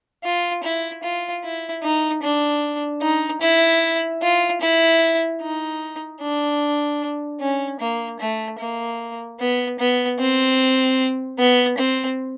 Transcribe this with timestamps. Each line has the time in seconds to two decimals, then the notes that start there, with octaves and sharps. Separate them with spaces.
0.24 F4
0.63 E4
1.03 F4
1.43 E4
1.83 D#4
2.23 D4
3.02 D#4
3.41 E4
4.22 F4
4.61 E4
5.42 D#4
6.21 D4
7.40 C#4
7.80 A#3
8.20 A3
8.59 A#3
9.40 B3
9.79 B3
10.19 C4
11.38 B3
11.78 C4